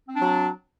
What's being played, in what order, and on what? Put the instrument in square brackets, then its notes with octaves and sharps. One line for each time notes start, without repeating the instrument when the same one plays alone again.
[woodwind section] C4
D4
F#3